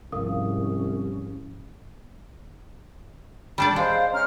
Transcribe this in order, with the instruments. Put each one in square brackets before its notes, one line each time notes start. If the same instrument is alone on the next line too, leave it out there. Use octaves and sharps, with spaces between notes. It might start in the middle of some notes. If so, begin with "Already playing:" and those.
[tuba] C2 [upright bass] G#2 F3 [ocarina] C#4 [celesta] A#4 F5 D#6
[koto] G3 D4 D5
[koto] G#3 [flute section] C5 F5
[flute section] C#4 A#5 F6